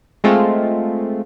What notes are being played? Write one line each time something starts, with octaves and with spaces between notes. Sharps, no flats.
G#3 A3 C4 F4